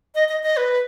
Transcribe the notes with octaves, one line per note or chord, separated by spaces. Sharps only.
D#5
D#5
D#5
B4